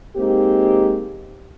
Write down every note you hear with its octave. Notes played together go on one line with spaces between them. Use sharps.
G#3 A#3 C4 D#4 G4